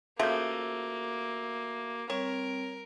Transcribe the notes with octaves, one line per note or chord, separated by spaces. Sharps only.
C#3 F3 A3 A#3 F#4 E5 G6
G3 C4 A#4 C#5